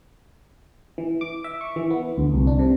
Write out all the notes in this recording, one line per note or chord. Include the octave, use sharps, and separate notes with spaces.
E3
D6
E5
C#6
E3
B3
D2
C2
D4
C3